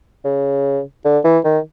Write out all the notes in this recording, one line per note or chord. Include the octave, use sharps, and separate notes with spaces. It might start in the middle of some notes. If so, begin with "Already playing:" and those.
C#3
D3
E3
D#3